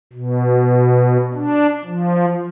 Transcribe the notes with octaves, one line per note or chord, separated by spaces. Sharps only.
B2
D4
F3